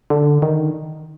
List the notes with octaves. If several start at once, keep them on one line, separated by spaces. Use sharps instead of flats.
D3
D#3